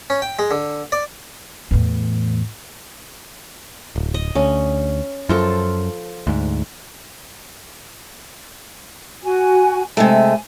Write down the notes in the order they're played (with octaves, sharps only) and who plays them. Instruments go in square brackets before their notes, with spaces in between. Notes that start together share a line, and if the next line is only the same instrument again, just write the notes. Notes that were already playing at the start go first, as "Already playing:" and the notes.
[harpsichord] C#4
G5
G#3
D3
D5
[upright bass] E2 A2
[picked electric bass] D1
[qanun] D#5
[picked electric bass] D2 [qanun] C#4
[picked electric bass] F#2 [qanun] F3 F4 A4
[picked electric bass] D2 G#2
[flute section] F#4 G#5
[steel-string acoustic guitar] C3 G#3 A3 [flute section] G#5